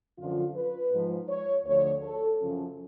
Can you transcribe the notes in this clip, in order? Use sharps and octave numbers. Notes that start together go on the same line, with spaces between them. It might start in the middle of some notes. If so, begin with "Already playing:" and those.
F#2 D3 F3 F4
B4
G#2 F3
C#5
D2 D3 F3 C#5
A4
F#2 C#3 F3 C#4